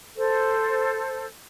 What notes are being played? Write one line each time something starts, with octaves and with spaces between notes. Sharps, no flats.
A4 C5